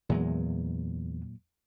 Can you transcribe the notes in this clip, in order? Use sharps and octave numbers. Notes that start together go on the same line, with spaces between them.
E2 A#2 F#3 G#3